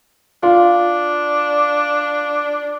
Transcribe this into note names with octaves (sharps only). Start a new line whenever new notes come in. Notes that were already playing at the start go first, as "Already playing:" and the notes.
D4 F4